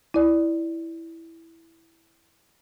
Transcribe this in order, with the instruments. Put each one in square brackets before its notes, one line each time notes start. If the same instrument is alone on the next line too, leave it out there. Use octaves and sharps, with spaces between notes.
[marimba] E4 D5